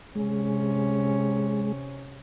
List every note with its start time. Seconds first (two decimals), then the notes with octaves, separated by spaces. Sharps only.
0.15 C3 G#3 C#4